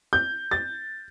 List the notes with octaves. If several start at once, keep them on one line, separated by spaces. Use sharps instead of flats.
G6
A6